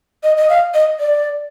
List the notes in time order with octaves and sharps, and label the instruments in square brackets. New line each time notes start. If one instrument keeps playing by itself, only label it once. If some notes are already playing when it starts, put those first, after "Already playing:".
[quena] D#5
D#5
F5
D#5
D5